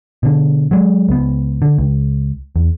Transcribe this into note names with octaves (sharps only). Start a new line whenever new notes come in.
B2 D3
F#3 G#3
C#2 B3
D3
C#2
E2